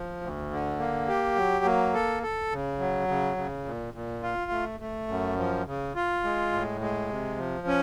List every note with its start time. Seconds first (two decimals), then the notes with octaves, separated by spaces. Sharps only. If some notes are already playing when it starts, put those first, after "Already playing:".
Already playing: F3
0.21 D2
0.51 D3
0.79 A#3
1.08 G4
1.36 F#3
1.65 A#3
1.94 A4
2.23 A4
2.51 C#3
2.79 F#3
3.08 C#3
3.37 C#3
3.65 A#2
3.94 A#2
4.23 F4
4.51 A3
4.80 A3
5.08 F#2
5.37 F3
5.67 C#3
5.95 F4
6.24 G#3
6.52 A2
6.81 G#3
7.09 C3
7.38 F3
7.67 C#4